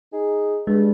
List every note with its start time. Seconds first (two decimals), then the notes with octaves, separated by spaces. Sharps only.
0.13 D#4 G#4
0.67 G2 G#3